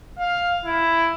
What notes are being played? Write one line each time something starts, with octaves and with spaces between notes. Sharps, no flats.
F5
E4